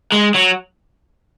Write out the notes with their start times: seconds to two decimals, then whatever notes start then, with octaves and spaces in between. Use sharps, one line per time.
0.12 G#3
0.34 F#3